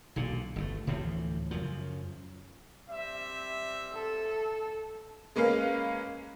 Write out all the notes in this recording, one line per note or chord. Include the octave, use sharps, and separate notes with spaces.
B1 A#2 D3
G1 B2 A3
D2 A2 E3 F3
F#2 C#3 F3
G3 C4 E5
A4
G#3 A#3 C#4 B4 F5